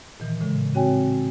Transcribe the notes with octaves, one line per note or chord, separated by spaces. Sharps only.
A#2 D#3 E3
A2 C#3 G#3
C4 F#4 C#5 G5 G#5